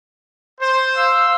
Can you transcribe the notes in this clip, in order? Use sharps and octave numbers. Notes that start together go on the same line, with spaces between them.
C5
F5 C6 E6